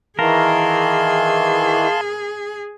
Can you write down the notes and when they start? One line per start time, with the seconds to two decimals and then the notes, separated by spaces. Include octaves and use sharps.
0.19 D#3 E3 G#4 A#4 F5 A5 C6